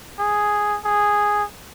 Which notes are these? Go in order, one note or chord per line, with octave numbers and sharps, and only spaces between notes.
G#4
G#4